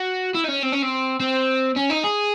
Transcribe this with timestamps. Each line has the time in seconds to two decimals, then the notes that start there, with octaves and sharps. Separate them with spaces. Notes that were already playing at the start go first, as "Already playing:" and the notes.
Already playing: F#4
0.35 E4
0.44 D#4
0.49 C#4
0.63 C4
0.73 C#4
0.83 C4
1.20 C4
1.77 C#4
1.90 D#4
2.05 G#4